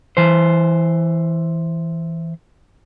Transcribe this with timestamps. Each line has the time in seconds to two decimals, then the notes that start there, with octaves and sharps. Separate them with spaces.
0.17 E3 C5